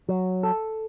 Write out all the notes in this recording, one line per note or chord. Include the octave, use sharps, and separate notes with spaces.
F#3
A4